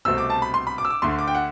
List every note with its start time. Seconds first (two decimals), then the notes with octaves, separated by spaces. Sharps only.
0.05 C2 B2 A3 C4 E6
0.18 D6
0.30 A5
0.42 B5
0.54 C6
0.67 B5
0.78 D6
0.85 E6
0.90 D6
1.02 D2 D3 A3 C6
1.19 D6
1.28 G5
1.35 F#5